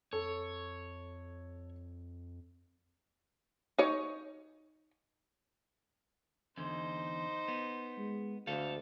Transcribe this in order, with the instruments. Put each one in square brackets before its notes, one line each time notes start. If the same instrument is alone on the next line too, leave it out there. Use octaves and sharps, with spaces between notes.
[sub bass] F2 [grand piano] A4 [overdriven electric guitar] C#5
[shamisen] D#4 C#5
[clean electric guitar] E2 D3 [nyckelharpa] D#4 C5
[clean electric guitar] B3
[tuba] G#3
[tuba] D2 [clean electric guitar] A4 F5